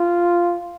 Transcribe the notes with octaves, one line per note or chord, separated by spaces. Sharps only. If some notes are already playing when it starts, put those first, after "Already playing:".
Already playing: F4